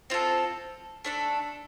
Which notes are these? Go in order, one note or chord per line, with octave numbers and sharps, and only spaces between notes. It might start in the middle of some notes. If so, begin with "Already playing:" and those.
C4 F4 A4
A3 D4 A4